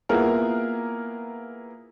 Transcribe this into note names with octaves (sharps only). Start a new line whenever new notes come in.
A#3 B3 E4 F4 G#4 A#4